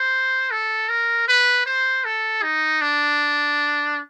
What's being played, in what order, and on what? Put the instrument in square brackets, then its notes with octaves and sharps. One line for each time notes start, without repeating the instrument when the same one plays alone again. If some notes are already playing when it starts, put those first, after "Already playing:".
Already playing: [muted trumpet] C5
A4
A#4
B4
C5
A4
D#4
D4